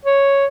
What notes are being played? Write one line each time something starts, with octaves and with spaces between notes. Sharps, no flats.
C#5